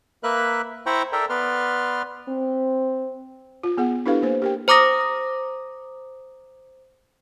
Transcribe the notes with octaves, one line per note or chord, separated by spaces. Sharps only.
A#3 A#4 B4 E5 F#6
E4 C5 G5 A#5 B5 C#6
A4 A#4 D5 E5 G5 A#5
B3 B4 D5 C6 F6
C4
F4
B3 G#4 F#5
D4 E4 G4 A4 B4 F5
A#3 C5
G4 A#4 G5
C5 A#5 D6 D#6 A#6